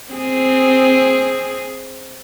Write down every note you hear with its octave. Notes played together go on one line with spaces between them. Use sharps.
C4 G#4